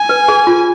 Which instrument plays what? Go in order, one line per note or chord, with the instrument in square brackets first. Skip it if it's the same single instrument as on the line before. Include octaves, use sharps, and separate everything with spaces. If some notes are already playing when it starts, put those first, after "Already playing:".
Already playing: [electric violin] G#5
[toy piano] B4
G#4
F4